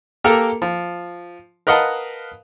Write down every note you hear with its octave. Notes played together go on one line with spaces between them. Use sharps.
A#3 G4 A4 A#4
F3
A#4 B4 D#5 F5 F#5 A5